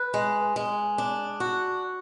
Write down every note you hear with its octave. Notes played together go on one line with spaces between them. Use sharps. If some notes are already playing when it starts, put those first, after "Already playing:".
Already playing: B4
G#3
G#3
D4
F#4